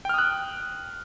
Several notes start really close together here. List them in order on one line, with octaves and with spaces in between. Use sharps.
G5 F6 D#6 F#6